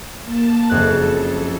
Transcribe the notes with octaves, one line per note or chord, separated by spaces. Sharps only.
A#3 A5
F#1 F2 A4 F#6